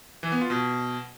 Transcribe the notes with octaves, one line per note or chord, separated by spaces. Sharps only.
E3
B3
F4
B2